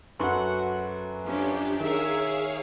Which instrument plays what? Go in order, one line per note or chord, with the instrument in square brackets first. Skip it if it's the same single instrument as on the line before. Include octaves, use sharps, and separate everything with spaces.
[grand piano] F#2 C6 C#6 [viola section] F#4 F#5 [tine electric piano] A4 B4 F#6
[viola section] F3 C#4 [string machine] D4 G4
[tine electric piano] D#3 [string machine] G#4 C#5 F5 [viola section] A#4 E5